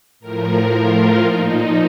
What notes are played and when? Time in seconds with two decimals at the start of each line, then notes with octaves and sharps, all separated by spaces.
0.20 A2 F3 A#4
0.72 F4
1.24 A#2 F3 D#4